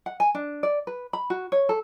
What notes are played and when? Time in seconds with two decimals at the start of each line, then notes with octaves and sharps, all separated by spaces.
0.06 F#5
0.20 G#5
0.35 D4
0.63 D5
0.87 B4
1.13 B5
1.30 F#4
1.52 C#5
1.69 A4